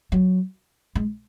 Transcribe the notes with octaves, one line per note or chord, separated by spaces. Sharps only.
F#3
G#3